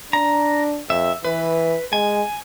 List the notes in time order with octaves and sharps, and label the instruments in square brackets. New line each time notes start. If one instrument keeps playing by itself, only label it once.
[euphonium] D4 [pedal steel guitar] A#5
[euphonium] F2 [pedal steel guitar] E5
[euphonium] E3 [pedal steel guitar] B4
[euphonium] G#3 [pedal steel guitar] G#5